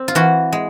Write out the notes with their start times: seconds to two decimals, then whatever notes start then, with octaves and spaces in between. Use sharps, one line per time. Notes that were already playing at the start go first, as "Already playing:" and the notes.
Already playing: C4
0.08 F4
0.15 E3 F#4
0.53 G#3